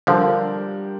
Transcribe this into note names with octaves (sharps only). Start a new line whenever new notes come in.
D3 F3 G3 D4 G4 A#4